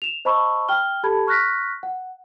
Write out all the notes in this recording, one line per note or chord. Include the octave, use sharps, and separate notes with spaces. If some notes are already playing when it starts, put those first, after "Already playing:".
E7 F7
C5 D#5 A5 B5 C#6 E6
G5 F6 G7
G4 A4 A5 B5 G#6
C#6 F6 F#6 A#6 B6
F#5